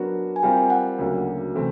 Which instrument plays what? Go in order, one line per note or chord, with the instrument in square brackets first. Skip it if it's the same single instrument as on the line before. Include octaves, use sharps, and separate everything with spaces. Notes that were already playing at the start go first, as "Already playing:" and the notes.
Already playing: [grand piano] F#3 B3 D4 F#4 A#4
[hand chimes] G#5
[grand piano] G3 C4 F4 A#4 [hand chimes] G5
[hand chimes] F#5
[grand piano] D2 C#3 F#3 A#3 D4
C3 E3 A3 C4